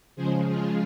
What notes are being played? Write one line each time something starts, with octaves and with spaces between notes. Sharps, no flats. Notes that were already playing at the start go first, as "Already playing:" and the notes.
C#3 F3 G#3 G#4 C5
F4 G#4